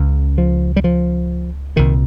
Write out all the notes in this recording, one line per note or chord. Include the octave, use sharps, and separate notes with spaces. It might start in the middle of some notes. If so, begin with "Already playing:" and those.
Already playing: C#2 C#3
F3
G3
F3
C2 A#2 D#3